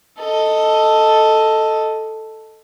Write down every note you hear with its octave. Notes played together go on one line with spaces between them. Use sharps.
A4 D#5